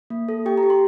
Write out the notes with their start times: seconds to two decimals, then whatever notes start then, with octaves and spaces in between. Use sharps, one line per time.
0.10 A#3
0.29 A4
0.46 G4 G5
0.58 A#5
0.63 G4
0.70 C6